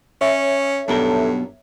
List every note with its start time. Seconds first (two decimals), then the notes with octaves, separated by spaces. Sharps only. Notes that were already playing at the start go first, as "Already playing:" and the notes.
0.21 C#4 C#5 E5
0.88 B1 G2 B2 A4 A#4